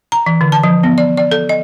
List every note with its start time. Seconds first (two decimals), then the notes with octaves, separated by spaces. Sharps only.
0.12 A#5
0.26 E3
0.41 D3
0.52 A5
0.63 F3
0.83 B3
0.98 D5
1.17 D5
1.31 A4
1.49 D#5